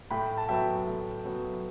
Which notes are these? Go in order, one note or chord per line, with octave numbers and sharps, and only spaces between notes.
A2 G5 B5
A5
F#3 B3 E5 G5
A2
F#3 B3